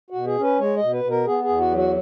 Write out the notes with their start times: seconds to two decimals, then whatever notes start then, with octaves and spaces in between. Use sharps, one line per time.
0.10 F#4
0.15 B2
0.27 G#4
0.38 C#4 B4
0.59 G#3 C#5
0.76 D#5
0.83 B2
0.93 B4
1.04 B2
1.11 A#4
1.27 B3 G#4
1.44 E2 G#4
1.60 F#4
1.72 F#3 F#4